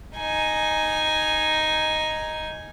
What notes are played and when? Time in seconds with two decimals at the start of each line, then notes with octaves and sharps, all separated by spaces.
0.17 D#4 G#5